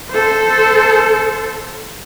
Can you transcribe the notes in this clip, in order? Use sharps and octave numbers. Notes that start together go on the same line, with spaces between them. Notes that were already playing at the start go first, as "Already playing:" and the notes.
A4 C5